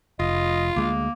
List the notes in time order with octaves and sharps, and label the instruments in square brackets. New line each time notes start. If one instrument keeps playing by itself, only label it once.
[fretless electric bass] F1 [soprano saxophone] F4 [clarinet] D#5
[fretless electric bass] D2 G#3 [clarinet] A#3